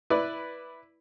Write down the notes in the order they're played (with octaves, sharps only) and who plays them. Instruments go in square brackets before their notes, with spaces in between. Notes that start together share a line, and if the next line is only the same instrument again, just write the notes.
[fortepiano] E4 B4 D5